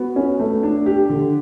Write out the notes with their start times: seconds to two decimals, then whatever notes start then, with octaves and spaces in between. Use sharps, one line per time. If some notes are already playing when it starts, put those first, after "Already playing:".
Already playing: B3 F#4
0.16 C#4
0.39 A3
0.63 D4
0.86 G4
1.10 D3